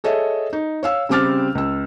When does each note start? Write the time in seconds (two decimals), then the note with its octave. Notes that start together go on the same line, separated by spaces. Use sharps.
0.04 G#4 A4 C#5 D#5 E5
0.53 D#4
0.83 C#5 F5 E6
1.09 C#3 G3 C4 D6 F6 A6
1.55 C#2 E6